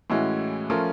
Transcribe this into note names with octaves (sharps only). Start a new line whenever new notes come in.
A2 E3 G#3 C#4 F#4
F3 A3 C#4 F4 A#4